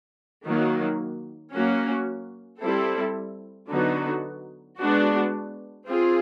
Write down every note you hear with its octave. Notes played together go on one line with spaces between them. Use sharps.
D#3 F#3 A#3
F#3 A#3 C#4 F#4
G3 C4 E4 A4
D3 F#3 B3 D#4 F#4
G#3 B3 D4 F#4
C4 F4 G#4